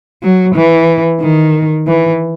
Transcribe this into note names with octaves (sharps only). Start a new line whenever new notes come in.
F#3
E3
D#3
E3